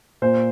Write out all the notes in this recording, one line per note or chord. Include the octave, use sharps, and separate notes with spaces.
A#2 C5